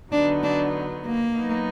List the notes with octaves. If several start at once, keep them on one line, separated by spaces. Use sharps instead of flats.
D3 F#3 B3 D4 D#4
D4
A#3
F#3 B3 D#4